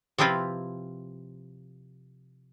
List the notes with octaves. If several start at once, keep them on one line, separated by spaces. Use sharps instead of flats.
C3 F3 C4 E4 F4 B4